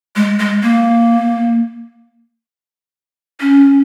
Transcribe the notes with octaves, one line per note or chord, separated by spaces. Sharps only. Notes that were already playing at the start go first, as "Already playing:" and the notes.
G#3
G#3
A#3
C#4